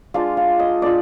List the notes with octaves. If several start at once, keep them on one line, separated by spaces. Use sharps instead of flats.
G#3 D4 F4 F5
F5
D#5
G#3 D4 F4 D5